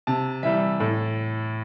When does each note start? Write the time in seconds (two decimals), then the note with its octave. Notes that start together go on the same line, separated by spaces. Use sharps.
0.07 C3 A5
0.43 E3 G3 E5
0.80 A2 A4